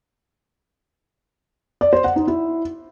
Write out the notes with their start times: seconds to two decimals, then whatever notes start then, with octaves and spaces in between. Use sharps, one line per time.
1.81 D5
1.93 C5
2.04 F#5
2.16 D#4
2.27 E4